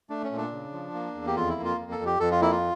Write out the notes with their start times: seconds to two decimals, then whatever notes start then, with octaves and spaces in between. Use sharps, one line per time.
0.10 A3 D4
0.24 C#4
0.31 A#2
0.37 D4
0.52 C#3
0.72 F3
0.94 A#3
1.15 E2
1.27 G4
1.35 F2 F4
1.49 E4
1.56 A#3
1.64 F4
1.78 F2
1.92 A4
1.99 F2
2.06 G4
2.20 F2 A4
2.31 F4
2.41 A#3 E4
2.52 F4